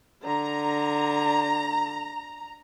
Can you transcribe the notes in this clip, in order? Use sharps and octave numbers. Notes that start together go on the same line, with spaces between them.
D3 A#5